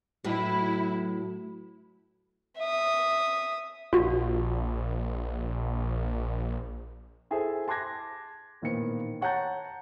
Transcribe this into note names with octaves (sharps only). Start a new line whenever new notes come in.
A2 F#3 E4 B4
E5 D#6
A#1 F4 F#4
E4 G#4 A4 C5 E5
A5 C6 D6 F#6 G#6 A#6
A1 A#2 D#3 B3 C5 C#7
C#5 F#5 A5 A#5 G6 A6